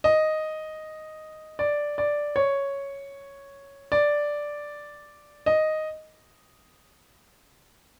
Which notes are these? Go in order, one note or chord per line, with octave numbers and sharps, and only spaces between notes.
D#5
D5
D5
C#5
D5
D#5